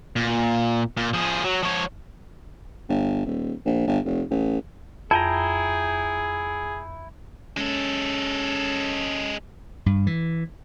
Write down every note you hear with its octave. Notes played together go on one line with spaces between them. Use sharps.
A#2
A#2
F3 G#4
F#3
F3 C#5
G1
D#1
A#1
G1
F1
A1
F2 E4 G#4 G5 A#5
G#3 C#4 A4
G2
E3